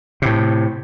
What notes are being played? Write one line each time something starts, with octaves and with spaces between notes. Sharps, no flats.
A2 C3